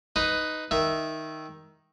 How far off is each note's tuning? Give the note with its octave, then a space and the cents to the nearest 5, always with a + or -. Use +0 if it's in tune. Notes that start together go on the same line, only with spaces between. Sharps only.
D#4 +0 B4 +10
D#3 +5 E5 +0